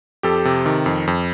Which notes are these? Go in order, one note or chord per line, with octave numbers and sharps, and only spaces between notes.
F2 G4 A4
C3
D#3
F2
F2